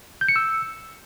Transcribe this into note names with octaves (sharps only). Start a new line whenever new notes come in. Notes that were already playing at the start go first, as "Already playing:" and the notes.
G6
C#7
E6